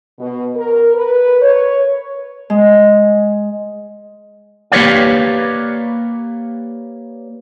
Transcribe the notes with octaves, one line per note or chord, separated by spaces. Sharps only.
B2
A#4
B4
C#5
G#3
A#3 G4 B4 C#5 D5 F5